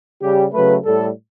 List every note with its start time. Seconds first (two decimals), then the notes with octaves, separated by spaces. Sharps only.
0.22 C#3 G3 G4
0.53 C#3 F#3 A3 B4
0.85 A2 G3 A4